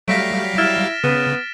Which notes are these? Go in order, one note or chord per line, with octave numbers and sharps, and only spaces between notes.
F#3 G3 A3 F5 A#6 B6 D7
E4 F6 A6 E7
C#3 B3